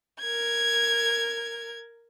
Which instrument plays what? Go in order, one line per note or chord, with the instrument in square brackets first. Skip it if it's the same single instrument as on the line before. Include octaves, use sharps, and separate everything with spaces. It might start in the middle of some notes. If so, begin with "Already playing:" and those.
[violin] A#4 G#6